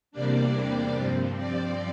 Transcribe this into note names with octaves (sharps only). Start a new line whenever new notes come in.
E2 C3 G3 A#3 D4 D5
G2 F3 C4
D5